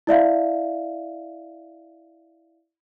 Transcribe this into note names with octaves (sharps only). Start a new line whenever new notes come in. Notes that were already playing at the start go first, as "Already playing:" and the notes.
E4 D5 E5 F5